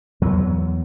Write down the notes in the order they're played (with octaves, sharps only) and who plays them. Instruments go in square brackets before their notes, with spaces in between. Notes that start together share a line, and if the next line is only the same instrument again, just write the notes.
[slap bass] E2 F#3 B3